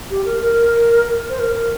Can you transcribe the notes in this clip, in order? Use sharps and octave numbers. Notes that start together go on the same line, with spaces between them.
G4
A#4
A#4
C5
A#4
A#4